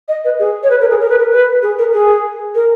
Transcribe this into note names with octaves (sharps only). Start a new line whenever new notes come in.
D#5
B4
G#4
C#5
B4
A#4
G#4
A#4
B4
A#4
B4
G#4
A#4
G#4
A#4